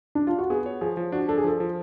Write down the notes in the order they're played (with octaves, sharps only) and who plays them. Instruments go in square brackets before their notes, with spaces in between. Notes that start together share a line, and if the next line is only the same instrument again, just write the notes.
[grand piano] D4
F4
F#4
[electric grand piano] B3 [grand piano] G#4
[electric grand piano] C#5
[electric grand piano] F3 [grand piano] G#4
[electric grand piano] F3
[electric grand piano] D4 [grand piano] F#4
[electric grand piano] D4 [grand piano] A4
[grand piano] G#4
[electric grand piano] F3 [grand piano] A4
[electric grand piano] F3